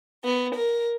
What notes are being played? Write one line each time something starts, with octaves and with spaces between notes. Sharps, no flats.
B3
A#4